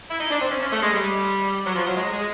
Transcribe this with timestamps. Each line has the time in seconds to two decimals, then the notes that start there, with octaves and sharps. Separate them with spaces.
0.11 E4
0.20 D#4
0.31 D4
0.41 C4
0.51 C#4
0.62 C#4
0.72 A3
0.82 G#3
0.93 G3
1.66 F#3
1.76 F3
1.86 F#3
1.97 G#3
2.13 G#3